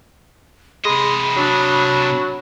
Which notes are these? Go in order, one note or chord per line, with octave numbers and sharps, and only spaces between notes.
C3 G#3 D#5 B5
F#3 D4